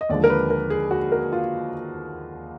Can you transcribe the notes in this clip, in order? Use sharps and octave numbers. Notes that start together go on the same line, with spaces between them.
D#5
D#2 D3 F3 G#3 D5
A#4
B4
A#4
G#4
F#4
A#4
F4